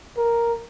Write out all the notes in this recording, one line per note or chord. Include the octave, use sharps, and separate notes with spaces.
A#4